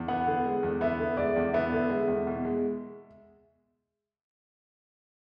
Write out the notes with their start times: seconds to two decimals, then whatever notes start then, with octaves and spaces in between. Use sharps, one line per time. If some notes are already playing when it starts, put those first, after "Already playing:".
Already playing: E2
0.08 B3 F#5
0.26 D3
0.45 G#3
0.63 E2
0.81 B3 E5
0.99 D3
1.17 G#3 D5
1.36 E2
1.54 B3 E5
1.72 D3
1.89 G#3
2.08 E2
2.27 B2
2.45 G#3